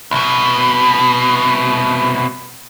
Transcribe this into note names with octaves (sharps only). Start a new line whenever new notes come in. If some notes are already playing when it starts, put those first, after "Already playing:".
C2 B2